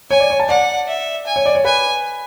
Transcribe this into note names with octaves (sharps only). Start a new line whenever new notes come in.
C#5 G#5
D5
C#5
A5
D5 F#5
E5
G#5
C#5
D5
C#5
B4 G#5